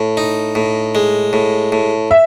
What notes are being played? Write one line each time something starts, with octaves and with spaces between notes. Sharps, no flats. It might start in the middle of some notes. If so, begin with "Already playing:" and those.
Already playing: A2
D#4
A2
G#3
A2
A2
E5